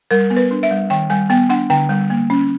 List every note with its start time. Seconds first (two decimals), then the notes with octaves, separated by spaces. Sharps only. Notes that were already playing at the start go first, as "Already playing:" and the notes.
0.11 G3 A#4
0.30 B3
0.37 B4
0.51 D4
0.63 E5
0.71 G3
0.90 D#3 G5
1.10 G3 G#5
1.30 B3 G5
1.49 D4 F#5
1.70 D3 G5
1.89 G3
2.10 A#3
2.30 C#4